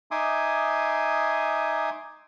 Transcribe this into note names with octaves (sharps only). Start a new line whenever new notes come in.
D#4 E5 G#5 C6 D6 D#6